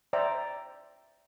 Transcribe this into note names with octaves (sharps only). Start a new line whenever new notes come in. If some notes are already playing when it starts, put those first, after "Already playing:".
C5 D5 E5 G5 A#5